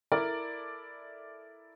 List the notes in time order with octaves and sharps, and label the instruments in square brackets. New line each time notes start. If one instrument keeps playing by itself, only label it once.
[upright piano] E4 A4 A#4 D5